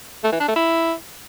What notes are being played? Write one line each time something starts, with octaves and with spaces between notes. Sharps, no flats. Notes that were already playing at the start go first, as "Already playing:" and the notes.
A3
E3
D4
A3
E4